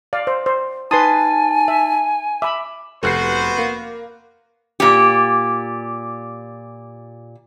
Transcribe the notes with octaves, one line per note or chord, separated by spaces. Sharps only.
D5 F5
C5
C5
D#4 B4 G#5 A5 C6 D#6 A6
E5
E5 B5 D6
F1 B3 F#4 C5 F#6 C7
A#3
A#2 G4